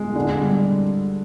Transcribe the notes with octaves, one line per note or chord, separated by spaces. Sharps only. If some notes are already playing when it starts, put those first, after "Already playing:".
Already playing: G#3
D3
G3